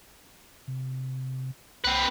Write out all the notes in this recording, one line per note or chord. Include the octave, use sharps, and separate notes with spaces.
C3
C2 C4 B4